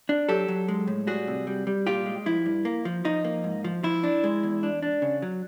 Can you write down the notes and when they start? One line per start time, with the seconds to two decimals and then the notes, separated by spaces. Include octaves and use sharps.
0.09 D4
0.29 F#3 G4 A4
0.48 F#3
0.68 G#3
0.87 A2
1.07 G3 F#4 G#4
1.28 C3
1.47 G3
1.67 G3
1.87 A#2 F4 G4
2.06 G#3
2.26 F3 E4
2.46 G2
2.65 A#3
2.85 F3
3.05 F3 D#4
3.25 A#3
3.44 G#2
3.64 F3
3.83 F3 E4
4.03 D4
4.24 G#3
4.43 E2
4.63 D4
4.83 D4
5.02 C#3
5.22 F#3